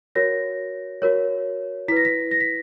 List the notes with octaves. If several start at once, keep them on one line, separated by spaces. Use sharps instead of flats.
F#4 A#4 C#5 A#6
F#4 A#4 C#5
E4 B4 A#6 B6
B6
A#6
B6